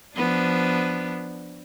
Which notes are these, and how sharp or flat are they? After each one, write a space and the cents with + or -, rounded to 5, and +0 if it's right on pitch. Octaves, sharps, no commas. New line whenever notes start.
F3 +0 B3 +0 D4 +0